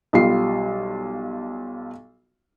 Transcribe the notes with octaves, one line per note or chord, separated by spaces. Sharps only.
B1 G3 F4 C7